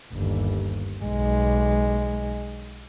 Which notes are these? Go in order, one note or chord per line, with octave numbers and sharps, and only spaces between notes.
G1 D#2
B1 G#3